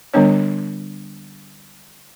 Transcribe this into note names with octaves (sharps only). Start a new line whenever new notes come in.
D3 G3 B3 D4 C#5